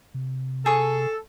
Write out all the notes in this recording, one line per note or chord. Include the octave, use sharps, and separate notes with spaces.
C3
G#4 A4 C#6